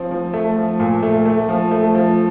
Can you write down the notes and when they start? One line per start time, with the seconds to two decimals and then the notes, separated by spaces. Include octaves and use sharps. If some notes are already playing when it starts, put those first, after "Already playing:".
Already playing: F3 C4
0.11 F3
0.34 A3
0.57 F3
0.80 A#2
1.03 A3
1.26 A3
1.49 F3
1.71 A3
1.94 F3